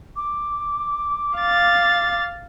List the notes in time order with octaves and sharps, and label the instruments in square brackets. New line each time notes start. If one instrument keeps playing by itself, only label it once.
[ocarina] D6
[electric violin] F5 A6